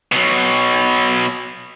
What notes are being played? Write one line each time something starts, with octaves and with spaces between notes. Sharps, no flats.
B2 F#3